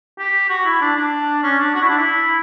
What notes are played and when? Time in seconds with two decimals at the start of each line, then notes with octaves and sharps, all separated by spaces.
0.19 G4
0.49 F#4
0.65 E4
0.81 D4
0.96 D4
1.43 C#4
1.59 D4
1.75 F#4
1.82 E4
1.89 D4
1.97 E4